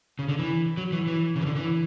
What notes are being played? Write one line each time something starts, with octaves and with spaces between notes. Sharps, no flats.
C#3
D3
E3
F#3
E3
E3
C#3
E3
D3
E3